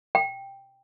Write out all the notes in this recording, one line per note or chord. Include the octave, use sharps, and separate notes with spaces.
G5